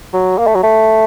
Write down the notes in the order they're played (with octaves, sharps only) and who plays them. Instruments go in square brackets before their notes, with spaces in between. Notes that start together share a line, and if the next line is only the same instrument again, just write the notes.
[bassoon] F#3
A#3
A3
F#3
A3